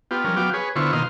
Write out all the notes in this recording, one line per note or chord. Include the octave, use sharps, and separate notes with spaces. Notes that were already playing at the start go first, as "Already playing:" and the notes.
B3 F4 G4
F3 G3 C#4 A#4
F#3 B3 F5 G5 D6
G#4 B4 C#5
D3 B3 E4 F4 C5 C#6
B2 D#3 A#3 D#5 F5 C6